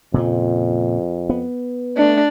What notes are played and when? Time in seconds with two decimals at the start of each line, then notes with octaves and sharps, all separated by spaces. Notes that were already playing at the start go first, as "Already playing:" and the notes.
0.14 F2 A#2 C#3 F3
1.30 B3
1.97 A3 D4